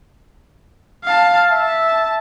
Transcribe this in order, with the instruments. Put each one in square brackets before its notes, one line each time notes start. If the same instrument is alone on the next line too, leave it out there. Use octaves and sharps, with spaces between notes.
[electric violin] F5 A5
[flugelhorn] E5 [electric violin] A5